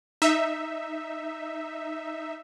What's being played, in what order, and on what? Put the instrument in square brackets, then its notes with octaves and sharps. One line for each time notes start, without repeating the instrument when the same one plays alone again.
[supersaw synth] D#4 E5